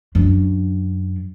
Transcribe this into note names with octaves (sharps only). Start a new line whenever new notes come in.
F#2 D4